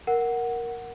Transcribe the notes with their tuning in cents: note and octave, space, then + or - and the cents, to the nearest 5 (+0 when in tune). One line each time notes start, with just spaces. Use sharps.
A#4 +5 F#5 +0